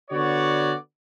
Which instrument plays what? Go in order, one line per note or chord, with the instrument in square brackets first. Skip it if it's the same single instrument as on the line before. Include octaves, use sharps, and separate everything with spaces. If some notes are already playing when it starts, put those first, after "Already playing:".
[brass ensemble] D3 B3 F#4 C#5 D5